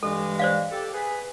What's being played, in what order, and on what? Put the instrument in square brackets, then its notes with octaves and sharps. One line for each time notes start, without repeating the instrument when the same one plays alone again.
[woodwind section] G2 E3 G#3 [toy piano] A4
[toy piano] C5 D5 F5
[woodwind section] G4 A4
G#4 B4